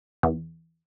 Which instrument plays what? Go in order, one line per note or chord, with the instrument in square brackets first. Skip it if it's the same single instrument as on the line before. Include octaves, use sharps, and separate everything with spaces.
[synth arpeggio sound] E2